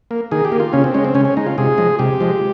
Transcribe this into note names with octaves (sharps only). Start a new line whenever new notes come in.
A#3
D#3 G#4
G4
A#3
F4
C#3 C#4
C4
G#3 C#4
C4
C#3 C#4
C#4
G#3 D#4
F4
C3 G#4
F3 G#3
C3 G4
F3 G#3